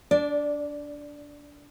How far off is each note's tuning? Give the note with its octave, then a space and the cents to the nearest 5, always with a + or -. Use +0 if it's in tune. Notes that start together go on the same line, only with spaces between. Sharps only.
D4 -20 D5 +0